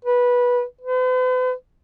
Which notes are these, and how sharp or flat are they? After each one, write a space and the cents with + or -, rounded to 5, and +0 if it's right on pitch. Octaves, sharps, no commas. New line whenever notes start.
B4 -15
B4 +45